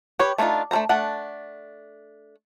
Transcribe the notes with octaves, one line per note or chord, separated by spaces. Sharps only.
G4 B4 C#5
A3 C4 D4 D#4 F4
A3 D4 A#4 C5 A#5
A3 D4 F#5